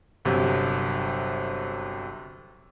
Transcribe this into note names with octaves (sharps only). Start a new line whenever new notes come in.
G1 C3 F#3